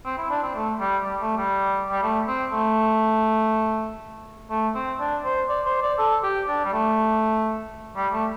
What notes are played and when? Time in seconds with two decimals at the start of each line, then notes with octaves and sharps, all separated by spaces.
0.05 C4
0.18 E4
0.30 D4
0.43 C4
0.55 A3
0.80 G3
1.04 G3
1.21 A3
1.37 G3
1.91 G3
2.03 A3
2.28 C4
2.52 A3
4.50 A3
4.75 C4
5.00 D4
5.25 C5
5.49 D5
5.66 C5
5.82 D5
5.99 A4
6.23 G4
6.48 D4
6.65 G3
6.73 A3
7.96 G3
8.13 A3